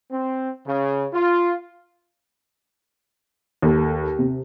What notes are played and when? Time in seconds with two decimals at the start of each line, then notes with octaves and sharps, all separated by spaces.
0.12 C4
0.67 C#3
1.13 F4
3.62 D#2 A4
4.19 C3